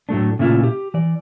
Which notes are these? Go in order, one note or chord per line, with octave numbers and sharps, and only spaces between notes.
A2 F#3 A3 D4
A#2 C#3 A3 E4 F4
G4
E3 D5